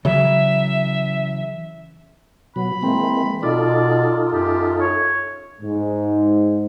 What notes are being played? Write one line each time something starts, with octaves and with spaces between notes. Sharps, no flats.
C#3 E3 F#3 E5
B2 F#3 B5
E3 G#3 A#3 C4
B2 D#4 F4 A4 D5
F#2 G4
C#5
G#2